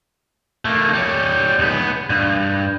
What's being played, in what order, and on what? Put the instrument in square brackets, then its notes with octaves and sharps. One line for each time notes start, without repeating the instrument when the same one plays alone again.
[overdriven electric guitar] A3 A#3
G3 C#5
C#2 B3
G2